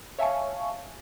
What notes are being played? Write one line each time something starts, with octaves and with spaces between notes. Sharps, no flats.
C#5 E5 F5 G#5 A5 C#6